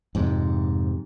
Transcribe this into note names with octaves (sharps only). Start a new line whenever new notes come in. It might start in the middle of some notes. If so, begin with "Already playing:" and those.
F2 G#2 C3